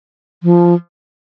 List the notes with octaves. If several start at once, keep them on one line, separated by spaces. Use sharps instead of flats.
F3